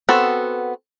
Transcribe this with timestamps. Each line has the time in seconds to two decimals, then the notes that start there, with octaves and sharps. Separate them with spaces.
0.09 B3 C4 F#4 A4